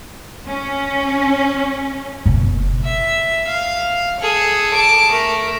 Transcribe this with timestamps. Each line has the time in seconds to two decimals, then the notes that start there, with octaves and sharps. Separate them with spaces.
0.46 C#4
2.26 F#1 B2
2.84 E5
3.47 F5
4.20 G#4 A4
4.74 A5 D6
5.12 A3 A#4